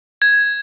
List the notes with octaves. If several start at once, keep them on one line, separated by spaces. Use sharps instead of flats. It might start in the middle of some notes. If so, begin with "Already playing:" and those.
G#6